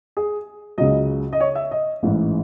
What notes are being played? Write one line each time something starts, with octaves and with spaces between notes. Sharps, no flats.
G#4
C#2 C#3 F#3 D#5
D#5
C#5
E5
D#5
A1 G#2 E3